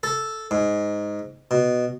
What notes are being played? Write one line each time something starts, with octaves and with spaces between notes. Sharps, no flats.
A4
G#2
B2